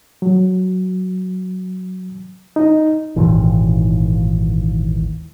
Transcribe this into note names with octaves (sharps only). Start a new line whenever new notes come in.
F#3
D#4
G#1 D#2 A#2 E3